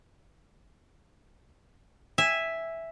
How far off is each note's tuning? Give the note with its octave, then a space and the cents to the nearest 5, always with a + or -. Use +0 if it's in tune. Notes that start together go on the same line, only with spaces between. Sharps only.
E5 +0 G#5 -15